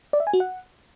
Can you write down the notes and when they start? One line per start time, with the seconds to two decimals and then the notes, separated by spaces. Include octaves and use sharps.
0.13 D5
0.20 E5
0.27 G#5
0.33 F#4
0.40 F#5